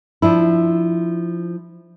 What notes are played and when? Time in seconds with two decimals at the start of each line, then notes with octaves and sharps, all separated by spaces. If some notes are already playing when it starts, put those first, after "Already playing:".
0.22 F3 D4 E4